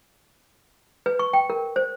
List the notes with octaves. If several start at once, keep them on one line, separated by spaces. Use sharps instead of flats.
B4
C#6
G5
A#4
C5